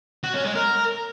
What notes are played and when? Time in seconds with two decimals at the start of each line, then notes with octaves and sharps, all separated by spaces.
0.24 F#4
0.34 C#4
0.45 G#3
0.55 A#4